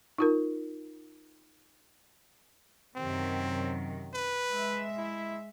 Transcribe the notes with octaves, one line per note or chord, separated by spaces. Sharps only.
D#4 F4 A#4
F#2 C3 D#3 C4
B4
G#3 E5
E4